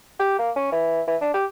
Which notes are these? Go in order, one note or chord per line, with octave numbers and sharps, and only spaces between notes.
G4
A#3
C#4
E3
E3
D4
G4